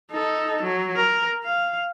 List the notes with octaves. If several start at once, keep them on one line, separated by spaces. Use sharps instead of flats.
D#4 A4
F#3
A#4
F5